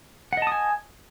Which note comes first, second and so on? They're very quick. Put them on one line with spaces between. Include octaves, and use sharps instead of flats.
F#5 D#5 A5 D#6 G#5